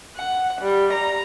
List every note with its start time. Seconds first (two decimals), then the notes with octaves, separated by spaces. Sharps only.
0.16 F#5
0.61 G3
0.93 A#5